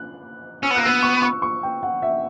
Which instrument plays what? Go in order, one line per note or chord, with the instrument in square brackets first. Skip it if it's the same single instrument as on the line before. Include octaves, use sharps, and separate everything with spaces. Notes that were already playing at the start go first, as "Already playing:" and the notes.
Already playing: [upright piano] F#6
[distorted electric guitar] C#4 [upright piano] E6
[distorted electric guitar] B3
[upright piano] F#6
[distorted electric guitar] A#3
[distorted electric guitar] B3 [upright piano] E6
[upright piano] C#6
C#6
C#6
G5
F#5
E5